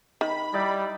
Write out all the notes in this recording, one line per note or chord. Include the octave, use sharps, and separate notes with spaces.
D#3 B5
G3 D#4 E4 D5